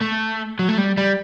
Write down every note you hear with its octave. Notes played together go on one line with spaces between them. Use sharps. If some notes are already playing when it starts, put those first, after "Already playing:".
A3
F#3
A3
G3
G3